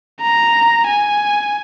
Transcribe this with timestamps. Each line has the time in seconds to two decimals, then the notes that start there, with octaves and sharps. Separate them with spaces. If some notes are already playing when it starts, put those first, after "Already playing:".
0.22 A#5
0.87 G#5